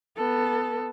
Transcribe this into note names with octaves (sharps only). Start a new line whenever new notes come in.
B3 A4